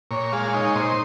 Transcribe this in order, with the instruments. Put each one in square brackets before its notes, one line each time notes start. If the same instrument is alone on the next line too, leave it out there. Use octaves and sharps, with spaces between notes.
[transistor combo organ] A#2 C#5
G#3 F5
D#4 C#5
A#2 C5